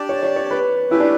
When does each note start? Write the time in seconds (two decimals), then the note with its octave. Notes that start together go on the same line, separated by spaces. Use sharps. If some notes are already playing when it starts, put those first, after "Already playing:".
Already playing: D4 G4 D5 A5
0.09 C#5
0.23 C#5
0.36 C#5
0.51 B4
0.91 A3 C#4 E4 G4 B4
1.00 D4